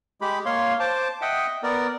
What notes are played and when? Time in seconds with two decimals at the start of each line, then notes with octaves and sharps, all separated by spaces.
0.21 G#3 G4 B5
0.45 A#3 C#5 F5 C6
0.80 C5 A5 D6
1.22 D#5 E5 F#5 G5
1.63 B3 A#4 D5